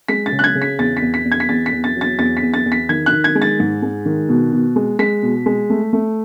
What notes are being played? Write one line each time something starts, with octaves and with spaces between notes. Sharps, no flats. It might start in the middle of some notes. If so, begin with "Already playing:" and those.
G#3 B6
A6
C#3
F#6
G#6
C#3
B6
E2 A6
B6
E2
B6
E2
G#6
B6
E2 A6
B6
E2
A6
F#3
A6
E2 A6
B6
E2
A6
E2
B6
D#3 G#6
F#6
D#3
G#6
G#3
A6
G#2
G#3
D#3
B2
B2
G#3
G#3 B6
B2
G#3
A3
A3